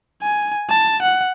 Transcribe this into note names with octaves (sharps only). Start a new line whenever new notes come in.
G#5
A5
F#5